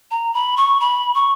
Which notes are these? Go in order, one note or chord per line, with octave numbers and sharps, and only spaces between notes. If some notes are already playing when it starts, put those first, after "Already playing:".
A#5
B5
C#6
B5
C#6